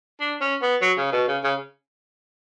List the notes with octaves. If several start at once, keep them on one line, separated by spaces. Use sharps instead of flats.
D4
C#4
B3
F#3
C#3
B2
C#3
C#3